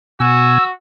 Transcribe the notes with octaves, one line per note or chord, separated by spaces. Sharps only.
B2 F#4 G#5 E6